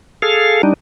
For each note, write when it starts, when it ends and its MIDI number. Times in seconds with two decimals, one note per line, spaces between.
0.22 0.62 68
0.22 0.62 69
0.22 0.62 77
0.63 0.73 55
0.63 0.73 62
0.63 0.73 63